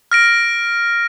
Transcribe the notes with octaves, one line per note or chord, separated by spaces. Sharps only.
F6 A#6 D7